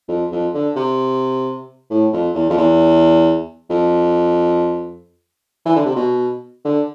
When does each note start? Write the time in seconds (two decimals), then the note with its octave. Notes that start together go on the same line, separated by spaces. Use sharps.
0.09 F2
0.32 F2
0.54 D3
0.76 C3
1.90 A2
2.13 F2
2.35 E2
2.50 F2
2.57 E2
3.70 F2
5.65 E3
5.76 D3
5.86 C3
5.96 B2
6.65 D3